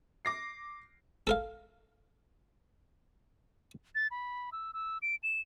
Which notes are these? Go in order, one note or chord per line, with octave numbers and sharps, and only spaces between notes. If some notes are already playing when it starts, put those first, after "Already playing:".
D6 A#6 C7
A4 A#4 F5
A6
B5
E6
E6
D7
E7